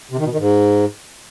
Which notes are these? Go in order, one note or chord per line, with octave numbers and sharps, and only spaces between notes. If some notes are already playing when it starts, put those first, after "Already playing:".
C3
D#3
B2
D#3
G#2